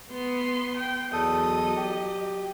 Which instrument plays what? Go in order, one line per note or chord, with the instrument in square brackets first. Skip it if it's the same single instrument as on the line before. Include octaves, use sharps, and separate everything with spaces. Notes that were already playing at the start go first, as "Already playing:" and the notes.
[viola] B3 C6
G5
[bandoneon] E2 A4 D#6 [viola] F#3 D#5
[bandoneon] G4